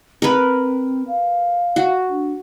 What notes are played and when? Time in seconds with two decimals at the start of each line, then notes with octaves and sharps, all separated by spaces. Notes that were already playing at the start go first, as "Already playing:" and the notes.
0.22 C4 A#4 B4
1.08 F5
1.76 F#4
2.09 D4